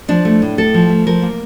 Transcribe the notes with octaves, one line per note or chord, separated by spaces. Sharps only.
F3 D4
A3
A2
A2 A4
F3
A3
F3 A#4
A#3